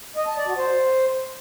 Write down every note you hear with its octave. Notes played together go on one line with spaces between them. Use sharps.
D#5
A5
D5
F#4
C5